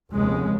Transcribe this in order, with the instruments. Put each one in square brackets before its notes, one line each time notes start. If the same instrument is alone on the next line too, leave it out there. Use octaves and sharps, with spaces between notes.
[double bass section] F1 D#2 C#3 G#3